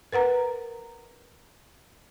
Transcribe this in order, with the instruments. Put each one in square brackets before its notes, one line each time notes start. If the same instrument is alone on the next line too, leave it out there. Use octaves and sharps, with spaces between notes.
[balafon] A#4 B4 F#5 A#5